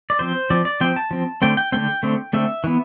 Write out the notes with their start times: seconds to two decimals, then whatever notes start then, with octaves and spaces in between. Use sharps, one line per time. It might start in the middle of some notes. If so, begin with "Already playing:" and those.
0.10 D5
0.19 F3 C4 C5
0.50 F3 C4 D5
0.65 D5
0.81 F3 C4 G5
0.96 A5
1.11 F3 C4
1.42 D3 A3 C4 G5
1.57 G5
1.72 D3 A3 C4 G5
2.03 D3 A3 C4
2.33 D3 A3 C4 E5
2.64 E3 B3